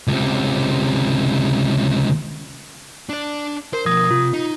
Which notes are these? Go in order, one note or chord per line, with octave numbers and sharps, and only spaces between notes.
C#2 C3
D4 D5
A#4 C5
B2 F3 D#6 G#6 A#6
C3 F4
D#4